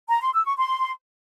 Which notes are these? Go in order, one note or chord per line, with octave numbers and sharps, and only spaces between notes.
A#5
C6
E6
C#6
C6